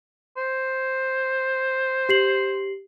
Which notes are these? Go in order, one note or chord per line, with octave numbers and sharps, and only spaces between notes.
C5
G4 C7 F#7